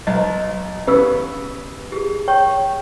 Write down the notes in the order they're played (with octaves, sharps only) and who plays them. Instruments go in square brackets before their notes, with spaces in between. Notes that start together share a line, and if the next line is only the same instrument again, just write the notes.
[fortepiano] B1 [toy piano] D#5
[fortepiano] C#3 E3 B3 [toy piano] G4 E6
[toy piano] G4 G#4
C#5 G5 C#6